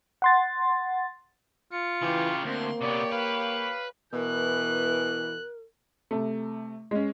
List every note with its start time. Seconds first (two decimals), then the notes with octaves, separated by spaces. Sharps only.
0.22 F#5 C6 A6
1.73 F4 C#7
2.02 C#3 E3 G4
2.44 D2 A#3 C4 C6
2.82 C3 B3 G4 C#5 D5
3.13 B4 F5
4.13 B2 E3 A#4 F#6
6.11 C3 A3
6.91 G#3 C#4